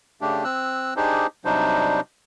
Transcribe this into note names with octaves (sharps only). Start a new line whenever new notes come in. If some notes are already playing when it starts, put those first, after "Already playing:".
C#3 A3 D4 G4
C4 E6 F#6
D4 D#4 G4 G#4 C5
C3 F#3 G3 D4 D#4 C5